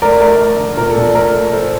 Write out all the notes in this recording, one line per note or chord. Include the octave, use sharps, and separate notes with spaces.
A3 A#4 D5
A3 A#4
A3
D3
A#2 A#4
A4
A#2
A3 A#4
A3
A3 A4 C5